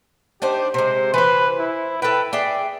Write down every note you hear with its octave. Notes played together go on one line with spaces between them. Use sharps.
D4 D#4 G4 C5
C3 G#3 C5
E3 B4 C5
E4
A4 B4 G5
G#4 D5 E5 G5